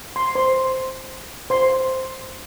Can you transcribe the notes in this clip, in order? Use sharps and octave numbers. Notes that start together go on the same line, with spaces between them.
C6
C5 C6
C5 C6